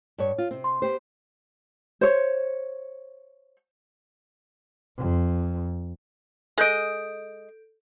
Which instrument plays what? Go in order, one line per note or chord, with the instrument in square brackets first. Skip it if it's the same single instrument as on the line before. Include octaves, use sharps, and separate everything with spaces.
[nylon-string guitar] G2 C#5
F4
C3 C4
[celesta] C6
[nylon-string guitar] B3 G4 C5
[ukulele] C5 C#5
[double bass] F2
[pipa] G#3 D#5 [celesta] A4 G6 D7